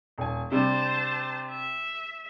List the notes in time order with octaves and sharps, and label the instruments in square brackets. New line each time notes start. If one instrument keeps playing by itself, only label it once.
[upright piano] D#1 G#5
[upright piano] C3 G3 D4 [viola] C5 A5
[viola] E5